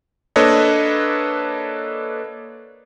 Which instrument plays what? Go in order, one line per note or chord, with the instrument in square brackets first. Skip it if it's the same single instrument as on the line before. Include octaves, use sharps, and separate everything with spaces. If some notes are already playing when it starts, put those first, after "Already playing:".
[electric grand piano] A#3 D4 A4 B4 C#5 D#5